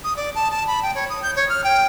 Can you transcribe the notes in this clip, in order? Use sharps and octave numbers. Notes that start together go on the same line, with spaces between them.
D#6
D5
A5
A5
B5
G5
C#5
D#6
G6
C#5
F6
G5